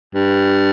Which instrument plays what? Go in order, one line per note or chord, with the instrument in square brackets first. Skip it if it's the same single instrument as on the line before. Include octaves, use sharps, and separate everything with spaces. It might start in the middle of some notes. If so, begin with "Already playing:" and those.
[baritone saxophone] G2